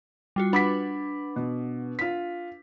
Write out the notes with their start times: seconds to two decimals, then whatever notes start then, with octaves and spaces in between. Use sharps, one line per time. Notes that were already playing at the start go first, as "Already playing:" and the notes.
0.36 G3 F4 F#4
0.53 D4 B4 F#5 B5 D6 B6
1.36 B2
1.99 F4 B6